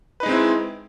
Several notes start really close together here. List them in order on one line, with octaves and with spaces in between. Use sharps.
B4 D#4 G#3 C4 E4